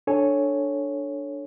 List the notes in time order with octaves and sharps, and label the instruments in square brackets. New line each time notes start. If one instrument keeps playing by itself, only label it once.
[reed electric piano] D4 A4 C#5 G#5